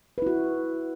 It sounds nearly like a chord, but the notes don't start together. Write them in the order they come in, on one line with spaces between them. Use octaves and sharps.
B4 E4 F#4